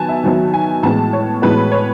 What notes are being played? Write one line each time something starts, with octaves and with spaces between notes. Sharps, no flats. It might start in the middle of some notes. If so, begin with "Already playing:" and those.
Already playing: D#3 F#3 B3 G#5 A5
E5
D#3 F#3 B3 D#4
G#5
A2 E3 G#3 B3 A5
C#5
A2 E3 G#3 B3 B4
C#5